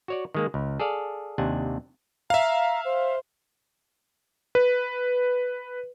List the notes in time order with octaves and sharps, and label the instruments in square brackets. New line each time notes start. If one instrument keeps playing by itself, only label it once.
[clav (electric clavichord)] F#4 C#5 D5
D#3 G#3 A#3
C#2
G#4 A4 D5 F5
D#2 C3 D4 F#5 G#5
[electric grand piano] E5 F5 [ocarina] A#5
[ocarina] C5
[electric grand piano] B4